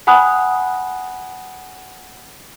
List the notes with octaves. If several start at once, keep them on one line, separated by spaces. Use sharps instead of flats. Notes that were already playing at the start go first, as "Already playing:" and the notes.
F#5 G#5 B5 D#6 F#6